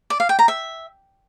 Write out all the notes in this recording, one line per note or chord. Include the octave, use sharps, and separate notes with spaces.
D5
F5
G5
A#5
E5